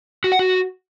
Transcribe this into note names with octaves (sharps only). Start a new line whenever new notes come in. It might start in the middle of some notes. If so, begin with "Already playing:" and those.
F#4
F#5
F#4